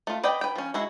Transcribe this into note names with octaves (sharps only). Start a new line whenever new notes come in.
A3 F4
B4 D5 D#5 G5
B4 G5
F3 C#4
G#3 E4 F#4